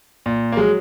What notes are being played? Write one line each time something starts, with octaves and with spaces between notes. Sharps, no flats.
A#2
A#3
F#3 G#3